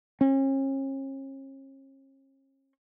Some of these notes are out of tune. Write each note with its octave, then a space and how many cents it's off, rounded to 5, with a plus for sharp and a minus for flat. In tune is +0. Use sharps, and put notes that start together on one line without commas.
C#4 -40